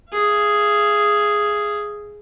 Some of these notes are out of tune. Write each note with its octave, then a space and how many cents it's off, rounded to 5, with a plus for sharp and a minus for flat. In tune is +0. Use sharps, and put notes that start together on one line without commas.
G#4 +0 F5 -45